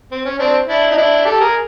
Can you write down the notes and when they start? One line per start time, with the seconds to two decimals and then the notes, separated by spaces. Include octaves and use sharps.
0.12 C4
0.25 C#4
0.39 C4 D4
0.68 D4 E4
0.91 D#4
0.97 D4 E4
1.25 G4 A4
1.40 G#4 A#4